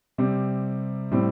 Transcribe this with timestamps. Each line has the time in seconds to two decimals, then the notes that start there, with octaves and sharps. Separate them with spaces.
0.18 C3 G3 C4
1.11 A2 G3 C4